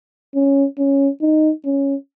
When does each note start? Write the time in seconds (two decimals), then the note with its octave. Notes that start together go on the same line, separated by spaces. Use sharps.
0.35 C#4
0.78 C#4
1.22 D#4
1.65 C#4